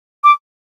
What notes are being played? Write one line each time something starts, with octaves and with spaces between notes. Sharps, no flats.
D6